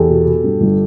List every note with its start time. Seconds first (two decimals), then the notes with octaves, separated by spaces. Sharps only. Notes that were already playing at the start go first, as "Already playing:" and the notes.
Already playing: E2 G4 A4
0.09 B2
0.26 B2
0.44 G2
0.61 G1